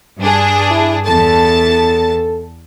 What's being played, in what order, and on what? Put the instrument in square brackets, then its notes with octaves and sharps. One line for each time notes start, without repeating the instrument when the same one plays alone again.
[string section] G2 D4 G#4
[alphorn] E4
[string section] E2 A5 [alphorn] A4